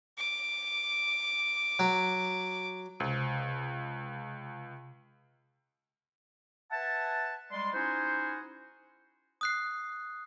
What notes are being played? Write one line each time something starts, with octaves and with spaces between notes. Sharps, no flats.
D6
F#3
C#2 C3
B4 E5 F#5 G#5 A5
G3 G#3 D5 A5 C6
C#4 D#4 E4 F#4 G#4 C5
D#6 F#6 C7